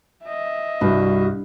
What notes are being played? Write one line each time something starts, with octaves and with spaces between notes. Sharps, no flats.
D#5 E5
C2 G2 F#4